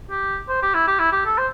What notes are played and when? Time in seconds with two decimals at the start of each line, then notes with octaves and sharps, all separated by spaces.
0.11 G4
0.49 C5
0.62 G4
0.74 E4
0.87 G4
0.99 E4
1.12 G4
1.26 A4
1.38 C5